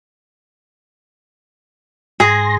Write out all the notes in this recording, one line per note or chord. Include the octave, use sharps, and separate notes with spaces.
G#2 G#4 C6 A#6